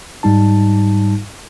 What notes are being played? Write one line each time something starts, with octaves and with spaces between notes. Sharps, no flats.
G#2 G3 D#4 A5